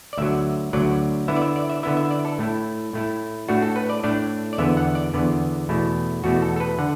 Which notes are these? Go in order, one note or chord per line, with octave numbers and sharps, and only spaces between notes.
D5
D2 D3 F#3 E5
D2 D3 F#3 D5
D3 B3 E4 E5
D5
E5
D5
E5
D3 B3 E4 E5
E5
D5
A4
A2 A3 E4
A2 A3 E4
A2 A3 D4 F#4
A4
B4
D5
A2 A3 D4 D5
D5
E2 D3 B3 E5
F#5
D5
E2 D3 B3
E2 B2 A3 E4
E2 B2 A3 E4 F#4
A4
A4
B4
D3 F#5